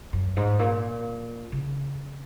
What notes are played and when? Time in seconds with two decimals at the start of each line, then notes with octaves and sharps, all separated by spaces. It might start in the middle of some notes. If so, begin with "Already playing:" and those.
0.13 F#2
0.37 G#2
0.59 A#2
1.52 C#3